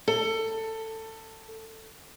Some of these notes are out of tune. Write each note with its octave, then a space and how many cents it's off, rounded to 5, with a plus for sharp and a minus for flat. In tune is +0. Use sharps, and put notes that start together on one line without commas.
A4 +20